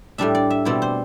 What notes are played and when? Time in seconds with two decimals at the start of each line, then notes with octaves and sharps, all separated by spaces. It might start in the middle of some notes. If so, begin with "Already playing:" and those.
0.18 A2 G3 D4 E5
0.35 D5
0.50 E5
0.65 B2 G3 C4 E4 D5
0.82 C5